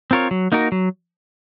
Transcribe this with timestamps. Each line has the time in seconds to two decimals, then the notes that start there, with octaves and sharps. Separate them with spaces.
0.11 C4 F4 A#4 C#5
0.31 F#3
0.52 A#3 D#4 F#4 A#4
0.72 F#3